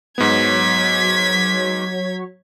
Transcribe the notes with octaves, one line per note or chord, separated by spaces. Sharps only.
G#2 F#3 B3 C#5 G#6 B6